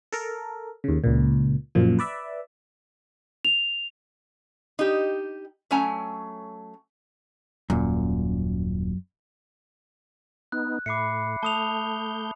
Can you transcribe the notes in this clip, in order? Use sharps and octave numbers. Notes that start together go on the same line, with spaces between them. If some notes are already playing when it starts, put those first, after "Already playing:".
A4 A#4
D#2 C#3
C#2 A#2
F#2 A#2 F3
B4 D5 E5
F7
D#4 G4
F#3 A3 C#4 G#5 A#5
D#1 F#2 A#2
B3 D#4 F#6
A2 E5 B5 D6 C7 C#7
A3 A5 D#6 G6 F7